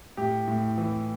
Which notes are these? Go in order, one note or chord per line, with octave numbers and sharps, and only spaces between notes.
A2 G4
A2
E3